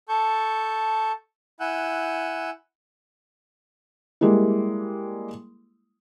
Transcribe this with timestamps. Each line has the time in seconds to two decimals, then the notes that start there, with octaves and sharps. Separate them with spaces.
0.09 A4 A5 C#6 G6
1.60 E4 F#5 G#5 E6 F#6 G6
4.21 G3 G#3 A#3 E4